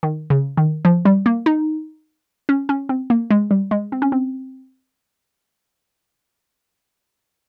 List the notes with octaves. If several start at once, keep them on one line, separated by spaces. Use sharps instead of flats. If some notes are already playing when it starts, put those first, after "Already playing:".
D#3
C#3
D#3
F3
G3
A#3
D#4
C#4
C#4
C4
A#3
G#3
G3
G#3
C4
C#4
C4